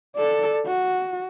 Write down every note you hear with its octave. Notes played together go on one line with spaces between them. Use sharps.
A4 D5
F#4